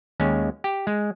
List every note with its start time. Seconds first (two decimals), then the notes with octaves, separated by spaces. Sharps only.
0.20 D#2 G#3 C#4
0.64 G4
0.87 G#3